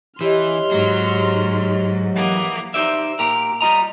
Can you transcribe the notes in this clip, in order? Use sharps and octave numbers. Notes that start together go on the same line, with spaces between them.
E3 G4 C#5 D#5 C6 F6
G#2 F#3
E3 A#3 F#5 D#6
D#4 G4 C5 D5 E5
A#2 G4 A#4
G3 F4 D#5 A#5